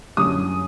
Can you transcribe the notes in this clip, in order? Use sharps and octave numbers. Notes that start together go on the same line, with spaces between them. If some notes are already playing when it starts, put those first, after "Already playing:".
F#2 D3 G3 D#6